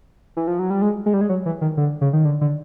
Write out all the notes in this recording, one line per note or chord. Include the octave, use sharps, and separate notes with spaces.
E3
F3
F#3
G3
G#3
G#3
G3
G#3
F#3
E3
D#3
D3
C#3
D#3
D3
D3